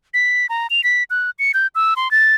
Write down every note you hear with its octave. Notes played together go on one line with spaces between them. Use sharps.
B6
A#5
F7
B6
F#6
C#7
G6
E6
C6
A6